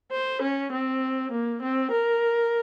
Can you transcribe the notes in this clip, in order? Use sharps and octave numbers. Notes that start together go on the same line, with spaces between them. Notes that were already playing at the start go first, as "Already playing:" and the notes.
C5
C#4
C4
A#3
C4
A#4